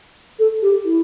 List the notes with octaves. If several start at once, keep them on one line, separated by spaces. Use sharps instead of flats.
A4
G4
E4